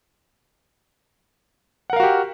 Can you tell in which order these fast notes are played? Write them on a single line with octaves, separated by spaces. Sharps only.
F#5 A#4 F5 F#4 G4